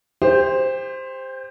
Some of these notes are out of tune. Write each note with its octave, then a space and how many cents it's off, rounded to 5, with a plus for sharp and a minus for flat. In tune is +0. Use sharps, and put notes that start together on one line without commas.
G4 +30 C5 +0